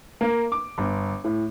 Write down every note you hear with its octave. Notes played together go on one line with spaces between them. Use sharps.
A#3
D6
G1
A2